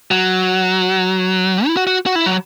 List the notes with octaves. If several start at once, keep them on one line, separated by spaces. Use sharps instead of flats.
F#3
E4
F#4
F#4
F#4
E4
F#3